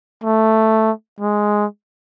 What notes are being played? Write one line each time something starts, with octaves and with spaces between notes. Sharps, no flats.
A3
G#3